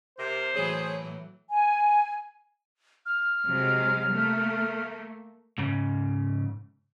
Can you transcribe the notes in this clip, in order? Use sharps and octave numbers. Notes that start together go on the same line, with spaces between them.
C3 A#4 C5
A2 E3 F#3 G#4 C#5
G#5
F6
C3 F#3 G#3
A3 A#3
G#2 C#3